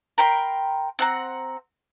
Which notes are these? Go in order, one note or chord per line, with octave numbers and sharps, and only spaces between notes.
A#4 G5 B5 C6
C4 F#5 A#5